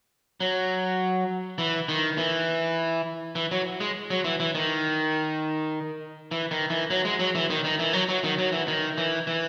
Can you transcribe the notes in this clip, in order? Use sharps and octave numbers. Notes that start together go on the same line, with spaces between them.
F#3
E3
D#3
E3
E3
F#3
G#3
F#3
E3
E3
D#3
E3
D#3
E3
F#3
G#3
F#3
E3
D#3
D#3
E3
F#3
F#3
D#3
F#3
E3
D#3
E3
E3